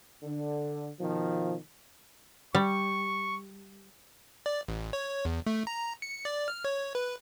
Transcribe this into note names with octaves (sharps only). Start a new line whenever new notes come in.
D3
B2 D#3 F3
G3 C#6
D5
A1
C#5
E2
A3
A#5
C#7
D5
F6
C#5
B4